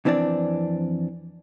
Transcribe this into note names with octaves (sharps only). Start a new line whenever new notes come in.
F2 E3 C4 D4 D5